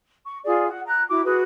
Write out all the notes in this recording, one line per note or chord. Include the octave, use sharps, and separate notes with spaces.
C#6
F4 G#4 D5
F#5
A#5 F#6
E4 F#4 D6
F#4 G#4 B4